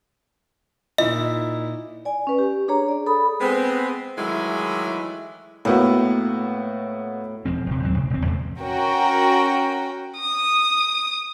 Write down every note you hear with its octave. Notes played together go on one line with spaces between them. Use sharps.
A#2 D#4 E4 D#5
D5 G#5
C#4 B4
G4
D4 G#4 C#5 A#5
G#4 D5
A4 B5 D#6
G#3 B3 C4
D#3 E3 F#3 G#3 A3 E4
A2 A#3 B3 F#4
E1 F3 C4
E1 C3
D#2 G#2 F#3 C4
A1 C3
E1 C4
E2 C3 A3
C#4 F#4 A#4 G5
D#6